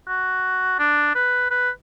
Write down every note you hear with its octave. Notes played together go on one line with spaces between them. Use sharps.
F#4
D4
B4
B4